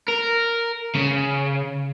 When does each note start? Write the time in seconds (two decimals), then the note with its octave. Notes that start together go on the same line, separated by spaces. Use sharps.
0.08 A#4
0.95 C#3